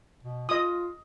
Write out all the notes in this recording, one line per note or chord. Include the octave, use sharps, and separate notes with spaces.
B2
F4 D#5 D#6